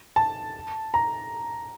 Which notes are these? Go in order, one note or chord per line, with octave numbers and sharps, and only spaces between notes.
A5
A#5